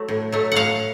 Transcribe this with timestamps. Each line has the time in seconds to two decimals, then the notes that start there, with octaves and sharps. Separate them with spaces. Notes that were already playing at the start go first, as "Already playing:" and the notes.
Already playing: F#3 A3
0.08 A2
0.32 F#3 A3
0.52 A2 F5 F#5